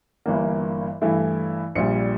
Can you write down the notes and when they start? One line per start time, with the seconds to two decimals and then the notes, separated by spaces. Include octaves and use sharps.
0.26 G1 G2 E3 A#3
1.01 G2 E3 A3 E4
1.75 A#1 A#2 G3 C#7